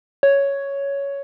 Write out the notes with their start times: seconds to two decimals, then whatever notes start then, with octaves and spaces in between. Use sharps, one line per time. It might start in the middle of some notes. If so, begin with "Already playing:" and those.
0.23 C#5